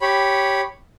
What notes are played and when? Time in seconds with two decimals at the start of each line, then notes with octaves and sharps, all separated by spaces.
0.01 G4 C#5 B5